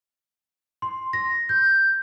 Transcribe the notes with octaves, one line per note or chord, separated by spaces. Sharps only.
C6
A#6
G6